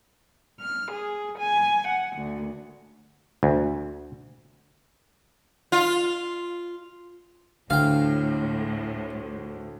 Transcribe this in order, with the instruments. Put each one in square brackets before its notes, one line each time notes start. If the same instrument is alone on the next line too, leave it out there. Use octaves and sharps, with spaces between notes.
[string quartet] F6
G#4
G#5
F#5
D2
[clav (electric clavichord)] D2
[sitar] F4
[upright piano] D2 [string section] A2 [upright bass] D3 [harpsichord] F5 G5